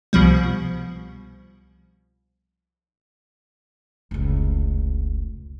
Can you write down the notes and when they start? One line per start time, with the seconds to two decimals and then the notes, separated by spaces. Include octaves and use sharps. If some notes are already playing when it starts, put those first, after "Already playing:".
0.13 C2 B2 F3 G3
4.11 F1 C#2